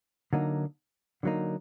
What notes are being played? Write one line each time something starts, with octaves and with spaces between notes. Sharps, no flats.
D3 F#3 A#3 D#4
D3 F#3 A#3 D#4